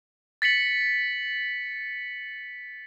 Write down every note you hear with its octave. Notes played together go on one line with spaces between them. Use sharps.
A6 B6 C#7 F#7